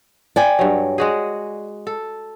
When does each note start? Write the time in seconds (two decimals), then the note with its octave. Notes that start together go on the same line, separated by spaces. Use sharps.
0.36 D5 G5 G#5
0.59 G2 F#3
0.98 G#3 F#4 G#4
1.87 A4